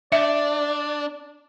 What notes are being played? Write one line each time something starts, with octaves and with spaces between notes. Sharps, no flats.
D4 D5 E5